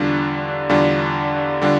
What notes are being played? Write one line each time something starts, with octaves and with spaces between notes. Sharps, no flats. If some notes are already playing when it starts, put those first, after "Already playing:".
Already playing: E2 D3 G3 D4 F4
E2 D3 G3 D4 F4
D3 G3 D4 F4